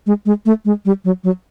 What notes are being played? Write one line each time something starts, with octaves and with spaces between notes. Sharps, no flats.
G#3
G#3
A3
G#3
G3
F#3
F#3